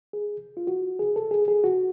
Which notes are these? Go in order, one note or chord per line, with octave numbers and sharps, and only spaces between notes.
G#4
F4
F#4
G#4
A4
G#4
G#4
F#4